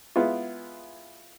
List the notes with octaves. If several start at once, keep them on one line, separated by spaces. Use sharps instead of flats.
G#3 B3 E4 F4